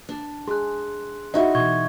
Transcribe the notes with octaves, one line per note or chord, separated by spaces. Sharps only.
D4
G#4 C6 F#6
D#4 E4 F#4
B2 E3 C#6 G#6